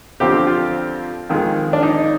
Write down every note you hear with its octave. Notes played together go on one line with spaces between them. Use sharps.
F2 D3 F3 C4 G4
F4
F2 D#3 G#3
D4
D#4